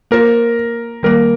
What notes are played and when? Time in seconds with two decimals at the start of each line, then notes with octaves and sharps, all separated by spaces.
0.11 A#3 F4 A#4 C5
1.03 D#3 G3 A#3 A#4